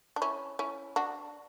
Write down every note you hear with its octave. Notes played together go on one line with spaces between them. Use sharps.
D4
C#4 E4
C#4 E4
D4 F#4